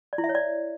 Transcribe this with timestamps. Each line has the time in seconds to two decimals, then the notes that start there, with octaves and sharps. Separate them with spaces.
0.13 D5
0.18 E4
0.24 E5
0.29 C#5
0.35 D5